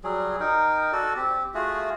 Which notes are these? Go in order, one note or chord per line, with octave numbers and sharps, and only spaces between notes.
F#3 G3 G#4
D#4 A#4 G5
F#4 A4 D5
C4 G4
A3 F4 F#4 G#4